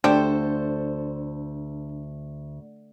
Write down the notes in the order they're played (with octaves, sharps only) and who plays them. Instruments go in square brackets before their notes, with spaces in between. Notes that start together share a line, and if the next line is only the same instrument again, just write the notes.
[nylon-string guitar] D2 [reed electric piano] D4 [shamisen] G4 [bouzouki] A4 C5